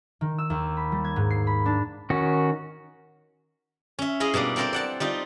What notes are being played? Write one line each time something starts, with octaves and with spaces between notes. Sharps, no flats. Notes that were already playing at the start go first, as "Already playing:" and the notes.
D#3
E6
D#2
B5
G3
G#6
G#2
C7
B5
D4
D#3 C#4 F#4
C#4 E5
E4 G#4 D#5 F5
B2 G3 A#3 D4
A#3 C4 A4 A#4 C5 G5
D5 F#5 A5
G3 D#4 F4